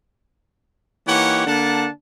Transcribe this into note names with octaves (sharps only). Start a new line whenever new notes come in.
E3 A#3 D#4 G4 C#5 F#5
D3 A#3 D4 F#5 A5